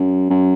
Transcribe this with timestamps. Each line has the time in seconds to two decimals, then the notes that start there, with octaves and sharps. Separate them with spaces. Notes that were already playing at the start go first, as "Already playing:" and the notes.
Already playing: F#2
0.30 F#2